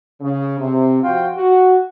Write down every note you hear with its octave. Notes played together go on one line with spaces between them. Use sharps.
C#3
C3
F3 F4 F#4 G5
F#4